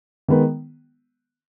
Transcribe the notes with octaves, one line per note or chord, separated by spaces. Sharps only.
D#3 G#3 B3